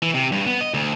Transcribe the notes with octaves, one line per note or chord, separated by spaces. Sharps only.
E3
C3
G2
B3
D#5
D2